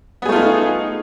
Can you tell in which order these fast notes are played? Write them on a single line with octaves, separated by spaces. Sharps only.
B3 G#4 A3 F4 D#4